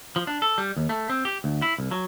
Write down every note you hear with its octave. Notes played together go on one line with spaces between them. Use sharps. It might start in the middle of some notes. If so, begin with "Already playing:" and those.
F3
D4
A4
G3
D#2
A3
C4
G4
D2
E4
C2
F#3